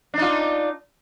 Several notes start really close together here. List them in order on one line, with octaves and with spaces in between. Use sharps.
D4 D#4 F4